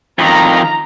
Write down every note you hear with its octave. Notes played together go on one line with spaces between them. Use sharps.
F2 D#3 A#5